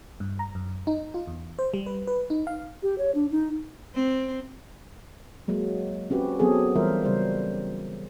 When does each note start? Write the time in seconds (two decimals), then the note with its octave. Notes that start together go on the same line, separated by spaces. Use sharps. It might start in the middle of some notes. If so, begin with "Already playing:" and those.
0.20 G2
0.39 A#5
0.55 F#2
0.87 D#4
1.14 F4
1.27 E2
1.59 C5
1.74 G3
1.86 B4
2.07 B4
2.30 D#4
2.47 F5
2.83 G4
2.98 C#5
3.15 D4
3.31 D#4
3.95 C4
5.48 F#3 G#3 A#3
6.10 C4 C#4 F#4 G4 B4
6.39 F#3 B3 C4 G#4 A4
6.76 E3 G3 F4 A#4 C5 E5
7.05 C#3 G3 C5